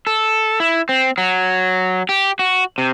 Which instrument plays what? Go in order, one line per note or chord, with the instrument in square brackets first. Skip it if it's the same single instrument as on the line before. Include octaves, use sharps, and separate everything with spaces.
[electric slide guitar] A4
E4
C4
F#3
G4
F#4
C3